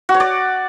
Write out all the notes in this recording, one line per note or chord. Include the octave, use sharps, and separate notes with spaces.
F#4
C#5
D5